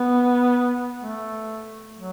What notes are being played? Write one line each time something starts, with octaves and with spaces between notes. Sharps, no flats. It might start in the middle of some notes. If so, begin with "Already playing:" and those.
Already playing: B3
A3
F#3